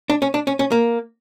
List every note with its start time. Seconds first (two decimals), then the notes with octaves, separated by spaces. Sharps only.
0.10 D4
0.22 C#4
0.34 D4
0.47 C#4
0.59 C#4
0.72 A#3